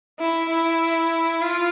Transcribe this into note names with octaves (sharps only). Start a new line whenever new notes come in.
E4
E4
F4